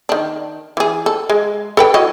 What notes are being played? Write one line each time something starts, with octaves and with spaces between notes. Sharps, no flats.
D#3 D4
E3 G#4
A4
G#3
A4 B4 G5
F#3 E4 D#5